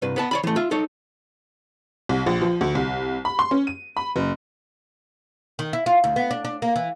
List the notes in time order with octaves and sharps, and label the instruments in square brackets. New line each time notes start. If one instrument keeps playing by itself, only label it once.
[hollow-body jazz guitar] C2 G2 B4
B3 B4 A5
C#5 D5 B5
E3 A3
F4 E5
D#4 A4 C#5
[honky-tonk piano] C2
A#1
F3
D2
C2
B5
C6
C#4
D#7
B5
F#1
[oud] D#3
E4
F4
D2
B3
D4
D4
A#3
E3